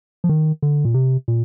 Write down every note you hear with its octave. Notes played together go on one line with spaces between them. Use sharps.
F3
D#3
D3
A#2
C3
A#2